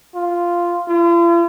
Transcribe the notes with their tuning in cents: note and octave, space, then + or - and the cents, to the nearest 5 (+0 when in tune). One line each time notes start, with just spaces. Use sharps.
F4 -5
F4 -45